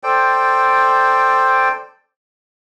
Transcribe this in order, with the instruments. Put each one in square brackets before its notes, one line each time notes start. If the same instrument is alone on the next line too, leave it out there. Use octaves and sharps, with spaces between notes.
[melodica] A4 C5 D5 G5